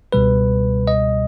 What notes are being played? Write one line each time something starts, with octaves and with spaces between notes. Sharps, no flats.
C#2 B2 G3 B4
D#5